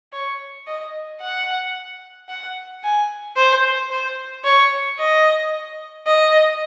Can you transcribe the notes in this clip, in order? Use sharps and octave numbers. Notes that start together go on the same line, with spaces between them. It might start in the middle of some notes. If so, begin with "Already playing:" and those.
C#5
D#5
F#5
F#5
G#5
C5
C5
C#5
D#5
D#5